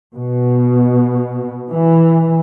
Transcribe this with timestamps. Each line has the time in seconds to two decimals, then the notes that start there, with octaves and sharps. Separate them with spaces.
0.15 B2
1.70 E3